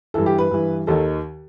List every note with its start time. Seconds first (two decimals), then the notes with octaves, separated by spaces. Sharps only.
0.14 G2 E3 A4
0.26 G4
0.38 B4
0.51 G2 E3
0.87 D#2 D#3 A4